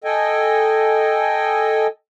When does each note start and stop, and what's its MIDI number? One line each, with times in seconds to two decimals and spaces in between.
0.04 1.87 69
0.04 1.87 75
0.04 1.87 79
0.04 1.87 80